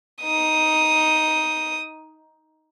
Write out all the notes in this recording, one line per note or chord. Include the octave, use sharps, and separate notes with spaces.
D#4 D#6